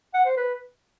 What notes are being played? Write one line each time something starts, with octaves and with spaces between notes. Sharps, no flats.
F#5
C5
B4